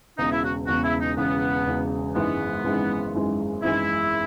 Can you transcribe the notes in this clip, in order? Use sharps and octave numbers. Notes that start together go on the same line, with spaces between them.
E1 E2 C#3 D#4
E4
F#4
E1 E2 C#3 F#4
E4
D#4
E1 E2 C#3 B3
E1 E2 C#3
G#1 F#2 E3 G#3 B3
G#1 F#2 E3 G#3
G#1 F#2 E3 G#3
G#1 F#2 E3 G#3 E4